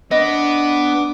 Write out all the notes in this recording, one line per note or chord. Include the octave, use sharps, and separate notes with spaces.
B3 D4 D#5 D6